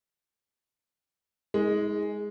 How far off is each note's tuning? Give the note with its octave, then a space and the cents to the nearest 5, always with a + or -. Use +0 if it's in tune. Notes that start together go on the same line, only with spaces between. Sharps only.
G#3 +0 D#4 +45